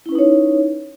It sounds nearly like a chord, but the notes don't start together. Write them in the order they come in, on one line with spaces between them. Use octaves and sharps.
E4 C#4 B4 D#4 C#5